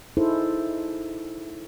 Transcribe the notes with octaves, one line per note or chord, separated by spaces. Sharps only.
D#4 E4 G#4 A4 C5